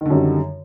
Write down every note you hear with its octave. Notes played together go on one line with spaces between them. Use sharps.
F#2 D3 D#3 G3